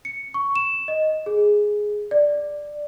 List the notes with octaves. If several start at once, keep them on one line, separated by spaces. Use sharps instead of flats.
C#7
C#6
E7
D#5
G#4
D5